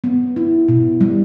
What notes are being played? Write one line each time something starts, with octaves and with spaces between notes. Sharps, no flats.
B3
E4
B2
G3